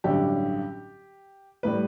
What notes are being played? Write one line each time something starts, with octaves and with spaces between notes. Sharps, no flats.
A1 G2 D3 F#3 G4
A2 G3 B4